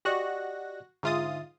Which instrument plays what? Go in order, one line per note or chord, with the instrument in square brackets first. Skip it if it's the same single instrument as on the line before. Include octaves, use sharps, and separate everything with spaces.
[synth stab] F#4 F#6 A#6 [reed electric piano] G4 D5 D#5
[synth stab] G#2 F4 D#6 [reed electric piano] D3 E5 A6